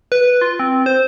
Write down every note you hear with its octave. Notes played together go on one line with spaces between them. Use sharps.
B4
F4
C4
C5